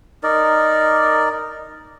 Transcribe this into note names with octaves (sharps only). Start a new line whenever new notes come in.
D#4 A#4 D5